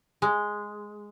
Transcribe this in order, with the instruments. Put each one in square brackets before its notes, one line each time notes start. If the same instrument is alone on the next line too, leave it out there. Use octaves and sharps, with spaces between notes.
[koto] G#3